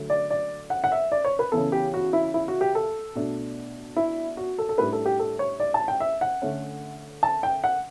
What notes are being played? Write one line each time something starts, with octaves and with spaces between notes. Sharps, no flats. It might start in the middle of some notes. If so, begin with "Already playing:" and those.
Already playing: D3 F#3 A3
D5
D5
F#5
F#5
E5
D5
C#5
B4
C#3 E3 B3 A4
G4
F#4
E4
E4
F#4
G4
A4
B2 A3 D4
E4
F#4
A4
A4
A2 G3 D4 B4
A4
G4
A4
C#5
D5
A5
G5
E5
F#5
D3 A3 C#4
A5
G5
F#5